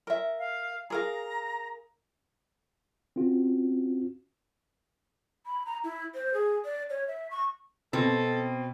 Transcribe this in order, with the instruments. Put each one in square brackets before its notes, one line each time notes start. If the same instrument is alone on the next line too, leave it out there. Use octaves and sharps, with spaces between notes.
[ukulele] A#4 E5
[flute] F5
[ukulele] G#4 A#4 F5 [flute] A#5
[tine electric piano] C4 C#4 F4 F#4
[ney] B5
A#5
E4
C5
G#4
D5
C#5
E5
C#6
[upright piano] B2 [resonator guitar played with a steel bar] C4 [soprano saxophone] A4